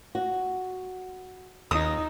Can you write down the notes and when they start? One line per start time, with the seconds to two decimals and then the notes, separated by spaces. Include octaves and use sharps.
0.15 F#4
1.71 D#2 D#4 D#6